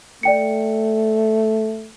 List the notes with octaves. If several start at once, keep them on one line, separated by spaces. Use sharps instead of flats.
A3 D5 G5 C#7